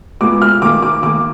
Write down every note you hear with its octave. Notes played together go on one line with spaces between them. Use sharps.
A#2 G#3 B3 D6
F6
D#3 A#3 D6
D6
D#3 A#3 D6